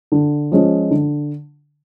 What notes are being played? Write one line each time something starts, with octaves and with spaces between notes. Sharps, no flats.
D3
F3 G#3 C#4
D3